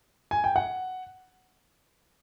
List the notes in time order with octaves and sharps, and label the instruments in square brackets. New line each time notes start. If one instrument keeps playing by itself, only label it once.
[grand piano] G#5
G5
F#5